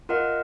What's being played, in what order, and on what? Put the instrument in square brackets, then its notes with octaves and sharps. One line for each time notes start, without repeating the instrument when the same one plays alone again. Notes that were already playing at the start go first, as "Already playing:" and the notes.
[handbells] F4 A#4 D#5 F#5